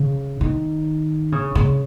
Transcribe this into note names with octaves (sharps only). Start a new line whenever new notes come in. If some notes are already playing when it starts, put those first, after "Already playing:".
Already playing: C#3
D#3
C#3
C#3